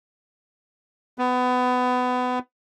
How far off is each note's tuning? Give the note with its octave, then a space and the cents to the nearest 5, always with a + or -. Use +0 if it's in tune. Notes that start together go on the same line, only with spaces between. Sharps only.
B3 +25